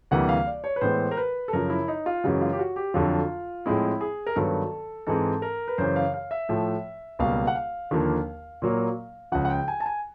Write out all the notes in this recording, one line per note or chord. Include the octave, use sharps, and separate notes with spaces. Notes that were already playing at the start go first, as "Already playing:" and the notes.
D2 C3 E3 G3 A#3 F#5
F5
D5
C#5
B4
A2 E3 G#3 B3 C5
A#4
B4
A4
F#2 C#3 F3 A#4
E4
D#4
F4
F#2 C#3 E3 G#3 F#4
F4
G4
F#4
G4
F2 D3 F#3 F4
A2 F3 G#3 C4 E4
G#4
A#4
G2 D#3 F#3 B3 A4
G#2 E3 G#3 C4 A4
A#4
B4
F#2 C#3 E3 C5
F5
F5
E5
A2 F3 A3
C#2 B2 G3 A#3 F5
F#5
F5
D#2 D3 F3 A#3
A#2 F#3 A#3
C#2 C#3 F3 F#5
F#5
G5
G#5
A5
G#5